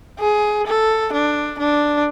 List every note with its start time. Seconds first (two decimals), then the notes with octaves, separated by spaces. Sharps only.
0.19 G#4
0.67 A4
1.13 D4
1.58 D4